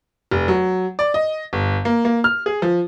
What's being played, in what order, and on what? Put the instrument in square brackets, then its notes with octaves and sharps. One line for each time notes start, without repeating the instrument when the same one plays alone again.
[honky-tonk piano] F1
F#3
D5
D#5
G1
A#3
A#3
F6
G#4
F3